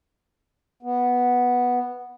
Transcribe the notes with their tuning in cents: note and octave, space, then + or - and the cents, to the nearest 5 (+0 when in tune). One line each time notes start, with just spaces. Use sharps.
B3 -5